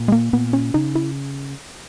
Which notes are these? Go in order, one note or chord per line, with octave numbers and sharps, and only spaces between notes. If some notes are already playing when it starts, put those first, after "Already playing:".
Already playing: A#2
G#3
A#3
A#2 B3
C#4
C#3 D#4
E4